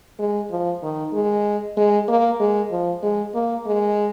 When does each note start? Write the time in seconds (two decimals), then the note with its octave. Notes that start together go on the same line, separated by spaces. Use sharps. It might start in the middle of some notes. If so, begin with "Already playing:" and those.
0.19 G#3
0.51 F3
0.83 D#3
1.13 G#3
1.77 G#3
2.08 A#3
2.40 G#3
2.71 F3
3.03 G#3
3.34 A#3
3.66 G#3